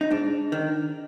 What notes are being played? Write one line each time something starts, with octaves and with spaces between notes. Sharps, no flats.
D#4
G#2 D4
D#3